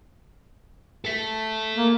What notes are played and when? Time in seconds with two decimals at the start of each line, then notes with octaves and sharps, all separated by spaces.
1.05 A4 E5
1.75 A#3